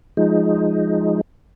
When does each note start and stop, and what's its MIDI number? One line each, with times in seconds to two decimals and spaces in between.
0.17 1.21 53
0.17 1.21 56
0.17 1.21 63